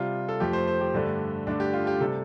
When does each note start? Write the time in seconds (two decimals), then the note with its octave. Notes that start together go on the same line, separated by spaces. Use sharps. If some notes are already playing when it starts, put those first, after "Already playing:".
Already playing: C3 G3 F4
0.28 A4
0.40 F2 F3 A3 G4
0.53 C5
0.67 C5
0.81 G4
0.94 G2 D3 A3
1.47 G2 D3 A3 D4
1.60 G4
1.73 F4
1.87 G4
2.00 C3 G3 A4